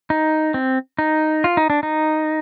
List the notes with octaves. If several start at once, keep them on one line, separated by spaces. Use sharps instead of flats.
D#4
C4
D#4
F4
D#4
D4
D#4